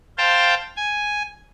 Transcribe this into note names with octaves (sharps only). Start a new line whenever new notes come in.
C5 F5 G5 A5
G#5